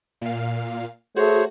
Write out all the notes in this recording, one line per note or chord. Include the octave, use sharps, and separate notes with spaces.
A#2 F5
A3 F#4 G#4 C5 C#5